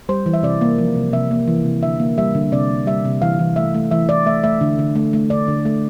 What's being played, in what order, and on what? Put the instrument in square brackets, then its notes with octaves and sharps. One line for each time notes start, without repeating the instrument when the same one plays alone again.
[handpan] G3 C5
E3
E5
C3 D5
A#3
F3
C3
C3 E5
A#3
E3
C3
D3 E5
A#3
G3 E5
D3
C3 D5
A#3
G3 E5
C3
E3 F5
E3
A3 E5
A3
E3 E5
E3 D5
A3 E5
A3 E5
D3
D3
A3
A3
D3 D5
D3
A3